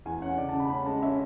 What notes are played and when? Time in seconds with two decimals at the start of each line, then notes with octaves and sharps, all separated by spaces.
0.05 E2 G#5
0.22 C#4 F#5
0.38 C#3 D5
0.49 A5
0.54 C#3
0.60 B5
0.70 C#4 B5
0.86 G#3 A5
1.02 C#4 E5